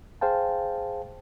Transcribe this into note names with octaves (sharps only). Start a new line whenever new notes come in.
G#4 C5 F5 G5 A5